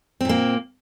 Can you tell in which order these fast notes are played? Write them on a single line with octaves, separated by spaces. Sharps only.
C4 A#2 A#3